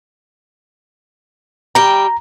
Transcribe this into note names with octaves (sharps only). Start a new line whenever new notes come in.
G3 G5 A#5